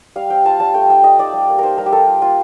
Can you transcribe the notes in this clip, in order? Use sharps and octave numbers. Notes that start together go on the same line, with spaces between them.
G3 F5
C4 G5
F4 A5
G3 A5
A3 G5
D#4 G5
A3 D#5
D#4 D5
G3
A#3
D#4 A#4 C5
G3 A#4
G4
A#3 A4
F4
A#3 F4